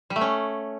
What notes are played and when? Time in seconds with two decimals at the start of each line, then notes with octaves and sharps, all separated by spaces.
0.10 G3
0.16 A3
0.21 C#4